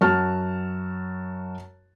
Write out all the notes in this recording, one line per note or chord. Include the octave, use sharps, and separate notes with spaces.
F#2 F#4 A5 F6